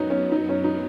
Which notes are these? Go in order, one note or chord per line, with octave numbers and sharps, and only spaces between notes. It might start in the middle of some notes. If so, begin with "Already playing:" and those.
Already playing: F#2 F#3 B3 C#4 D#4
C#4
D#4
C#4
D#4